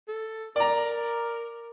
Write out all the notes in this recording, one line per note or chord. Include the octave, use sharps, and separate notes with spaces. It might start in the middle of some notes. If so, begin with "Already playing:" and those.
A4
A#4 D5 A#5